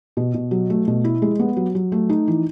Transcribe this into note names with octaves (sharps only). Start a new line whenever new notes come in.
B2
B2
F#3
A3
B2
E4
G#3
B3
F#3
F#3
A3
D#4
E3